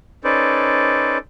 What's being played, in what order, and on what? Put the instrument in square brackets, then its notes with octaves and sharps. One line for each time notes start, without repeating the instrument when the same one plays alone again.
[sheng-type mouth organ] C#4 D#4 A4 B4 C5 D5